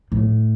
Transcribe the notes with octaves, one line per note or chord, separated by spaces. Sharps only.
A2